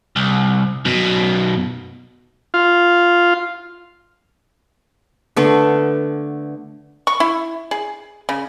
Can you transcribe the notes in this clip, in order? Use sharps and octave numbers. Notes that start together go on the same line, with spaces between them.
C2
F#2 B2
F4
D3 A3 B3
C#6
E4
G#4
C#3